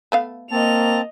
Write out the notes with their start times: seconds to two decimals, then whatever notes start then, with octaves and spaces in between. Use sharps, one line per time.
0.12 A3 B3 F5
0.51 A#3 C4 D#5 A5 F7